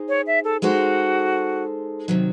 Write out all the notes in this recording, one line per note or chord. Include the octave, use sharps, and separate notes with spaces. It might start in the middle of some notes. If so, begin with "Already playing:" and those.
Already playing: D#4 G#4 C5
C#5
E5
A4
G#3 D#4 F#4 A4 C5
C3 D#3 F#3